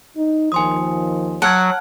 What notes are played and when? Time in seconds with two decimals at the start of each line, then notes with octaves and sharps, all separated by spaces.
0.16 D#4
0.52 D#2 D#3 F3 G#5 C6 D#6
1.42 F#3 F#5 A5 F6 G#6